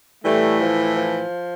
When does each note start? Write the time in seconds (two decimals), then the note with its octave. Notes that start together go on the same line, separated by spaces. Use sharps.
0.24 A2 E3 G3 A3
0.59 F3
0.95 F3